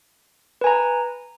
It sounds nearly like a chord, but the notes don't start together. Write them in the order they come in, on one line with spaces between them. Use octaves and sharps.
B4 G#5 A#5